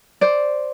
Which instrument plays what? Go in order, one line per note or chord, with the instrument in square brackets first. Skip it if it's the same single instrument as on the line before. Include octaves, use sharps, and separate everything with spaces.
[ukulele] C5 D5